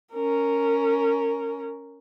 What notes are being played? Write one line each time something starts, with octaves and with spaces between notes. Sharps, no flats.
C#4 A#4